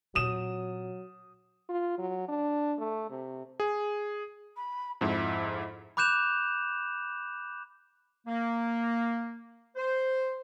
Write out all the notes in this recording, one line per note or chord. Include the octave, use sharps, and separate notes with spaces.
A#2 F#3 C4 D#6 E7
F4
F#3
D4
A3
C3
G#4
B5
F2 G#2 E4
B5 D6 F#6 G6 E7 F7
A#3
C5